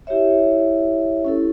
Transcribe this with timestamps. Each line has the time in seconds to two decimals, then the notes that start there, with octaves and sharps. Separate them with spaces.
0.07 E4 G4 C#5 E5
1.25 C#4 E4 A4